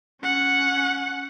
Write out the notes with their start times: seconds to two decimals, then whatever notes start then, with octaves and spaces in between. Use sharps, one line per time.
0.23 C#4 F#5